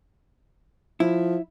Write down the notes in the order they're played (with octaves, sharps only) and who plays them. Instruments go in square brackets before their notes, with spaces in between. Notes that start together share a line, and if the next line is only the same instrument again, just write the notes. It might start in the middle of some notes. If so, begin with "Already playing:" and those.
[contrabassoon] F3 [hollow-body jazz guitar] E4